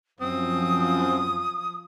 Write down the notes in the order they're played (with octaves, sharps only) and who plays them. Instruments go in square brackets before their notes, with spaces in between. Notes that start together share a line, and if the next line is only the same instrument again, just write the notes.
[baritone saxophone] F#2 [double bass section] F3 [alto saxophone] C4 [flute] D#6